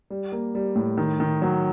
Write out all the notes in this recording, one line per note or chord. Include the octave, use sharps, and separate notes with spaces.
G3
A#3
G3
A2
D#3
D#3
F#3